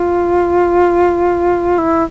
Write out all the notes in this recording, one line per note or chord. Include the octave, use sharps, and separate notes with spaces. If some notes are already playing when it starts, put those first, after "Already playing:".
Already playing: F4
E4